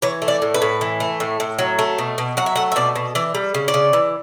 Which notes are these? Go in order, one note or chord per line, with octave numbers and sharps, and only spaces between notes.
E3 C#5
A3
D5
A2
B4
A2
E3
A3
A2
A2
F#3
A3
B2
B2
F#3 F#5
E5
A3 F#5
E5
B2 D5
B2
E3 D5
G3
C#3
D5
C#3
E3